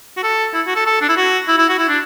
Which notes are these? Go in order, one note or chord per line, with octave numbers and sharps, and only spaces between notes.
F#4
A4
E4
F#4
A4
A4
D4
E4
F#4
E4
E4
F#4
E4
D4